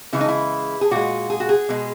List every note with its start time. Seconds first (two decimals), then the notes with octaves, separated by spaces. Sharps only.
0.13 C#3 E3 G#3 E4
0.21 D#4
0.28 E4
0.81 G#4
0.91 A#2 G#3 F#4
1.30 G#4
1.40 F#4
1.49 G#4
1.69 B2 G#3